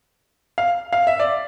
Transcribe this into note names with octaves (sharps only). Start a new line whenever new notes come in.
F5
F5
E5
D5